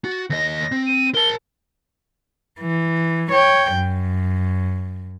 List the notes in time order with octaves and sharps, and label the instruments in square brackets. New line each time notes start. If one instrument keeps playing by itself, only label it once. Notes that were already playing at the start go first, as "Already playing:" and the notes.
[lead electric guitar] F#4 [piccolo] A6
[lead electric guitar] D#2 D#5 [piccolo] A#6
[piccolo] A#6
[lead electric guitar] C4
[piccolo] D#7
[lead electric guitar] A#4 A5 [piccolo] G7
[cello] E3
C#5 G5
F#2